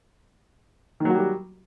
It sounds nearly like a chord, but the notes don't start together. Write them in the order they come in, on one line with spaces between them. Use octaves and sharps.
D#3 F#3 F#4 G3 G4